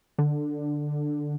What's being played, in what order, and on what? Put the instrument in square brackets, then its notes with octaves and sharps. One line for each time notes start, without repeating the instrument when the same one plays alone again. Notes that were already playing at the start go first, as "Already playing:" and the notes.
[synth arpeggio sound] D3